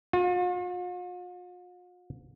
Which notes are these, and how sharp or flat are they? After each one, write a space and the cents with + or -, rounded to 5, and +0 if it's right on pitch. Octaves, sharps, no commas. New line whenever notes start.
F4 +45